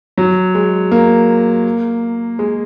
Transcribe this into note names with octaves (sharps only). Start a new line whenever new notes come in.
F#3
G#3
A#3
G#3